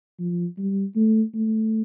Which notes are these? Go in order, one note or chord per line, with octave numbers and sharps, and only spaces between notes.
F3
G3
A3
A3